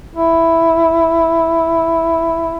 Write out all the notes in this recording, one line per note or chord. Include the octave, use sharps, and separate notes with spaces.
E4